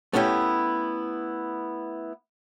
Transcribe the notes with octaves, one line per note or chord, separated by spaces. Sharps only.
A3 B3 C#4 E4 G4